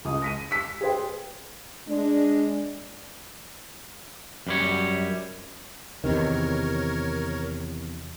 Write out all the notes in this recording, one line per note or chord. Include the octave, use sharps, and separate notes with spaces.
C#2 D#6
A#6 B6 D#7
E6 B6
G#4 B4 C5 G5
G#3 D4
F#2 G3 C#5
E2 C3 D#3 A#4 C#5